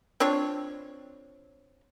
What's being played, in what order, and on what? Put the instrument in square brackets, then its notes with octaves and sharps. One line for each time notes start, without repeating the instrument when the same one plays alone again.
[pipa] C4 D4 F4 C#5